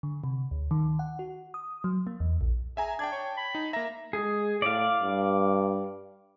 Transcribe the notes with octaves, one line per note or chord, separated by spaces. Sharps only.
D3
C3
D2
D#3
F#5
F#4
D#6
F#3
A#3
E2
A#1
G#4 E5 G#5 A#5
D4 G5 A5 G#6
C#5
B5
D#4
A#3 E5 A#5
G#3 G#4
A2 D5 F5
G2